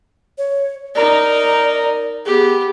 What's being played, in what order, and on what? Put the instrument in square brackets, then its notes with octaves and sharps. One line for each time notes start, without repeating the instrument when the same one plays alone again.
[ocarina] C#5
[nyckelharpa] D#4 A#4 [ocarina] D5
[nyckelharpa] B3 G4 [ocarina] G#4